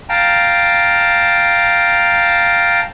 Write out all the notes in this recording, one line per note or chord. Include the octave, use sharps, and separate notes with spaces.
F5 G5 A5 A#5